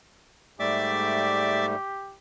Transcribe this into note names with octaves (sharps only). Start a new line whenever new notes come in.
G#2 G3 A3 G4 D5 E5 D6